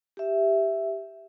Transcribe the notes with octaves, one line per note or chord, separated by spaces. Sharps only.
G4 E5